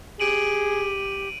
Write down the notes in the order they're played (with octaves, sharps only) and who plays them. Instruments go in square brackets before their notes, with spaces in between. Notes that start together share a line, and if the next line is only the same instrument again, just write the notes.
[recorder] G4 [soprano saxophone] G#4 [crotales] D7 D#7 F#7